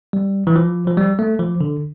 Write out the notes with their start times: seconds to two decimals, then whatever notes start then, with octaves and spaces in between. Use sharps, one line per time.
0.13 G3
0.47 E3
0.56 F3
0.87 F3
0.97 G3
1.19 A3
1.39 F3
1.61 D3